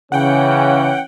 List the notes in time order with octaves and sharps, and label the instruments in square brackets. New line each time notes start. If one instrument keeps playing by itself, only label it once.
[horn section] C#3 [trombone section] E3 C#4 [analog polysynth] F#5 G5